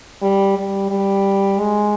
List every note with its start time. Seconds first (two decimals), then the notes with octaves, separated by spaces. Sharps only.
0.22 G3
0.57 G3
0.90 G3
1.60 G#3